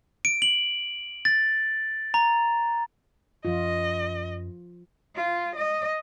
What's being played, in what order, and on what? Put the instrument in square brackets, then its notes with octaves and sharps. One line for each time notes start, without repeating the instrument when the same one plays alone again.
[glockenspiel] D7
F#7
A6
A#5
[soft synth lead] F#2 [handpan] F3 F4 [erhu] D#5
[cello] F4
D#5